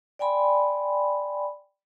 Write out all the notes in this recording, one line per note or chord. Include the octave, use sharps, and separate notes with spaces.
D5 G5 G#5 B5 C6